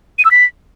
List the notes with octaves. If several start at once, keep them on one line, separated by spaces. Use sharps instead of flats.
D#7
E6
B6